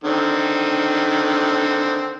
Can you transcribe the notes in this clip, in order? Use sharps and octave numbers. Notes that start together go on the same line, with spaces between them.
D3 D#3 C4